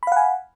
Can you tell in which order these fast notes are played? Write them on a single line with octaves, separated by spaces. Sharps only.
B5 F5 F#5 G#5